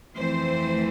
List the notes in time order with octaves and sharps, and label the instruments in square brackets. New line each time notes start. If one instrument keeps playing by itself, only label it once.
[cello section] F2 E3 A3 C4 C5